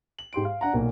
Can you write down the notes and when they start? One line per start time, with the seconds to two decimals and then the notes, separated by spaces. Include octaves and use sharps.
0.19 F#7
0.33 G#2 G4 C6 D7
0.45 F5
0.61 D4 F#5 A#5
0.74 B1 A#2 A#3